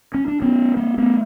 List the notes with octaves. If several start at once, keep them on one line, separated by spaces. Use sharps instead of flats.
C#4
D4
B3 C#4
A#3 C4
A3 B3